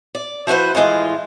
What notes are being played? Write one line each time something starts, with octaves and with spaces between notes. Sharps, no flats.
D5
F3 E4 F#4 B4 C5
A2 E3 G#3 F4